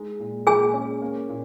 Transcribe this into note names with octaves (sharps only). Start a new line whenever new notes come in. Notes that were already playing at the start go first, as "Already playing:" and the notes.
Already playing: G#3 D#4
A#2
A#2 G#4 G#5
C#4
A#3
A#2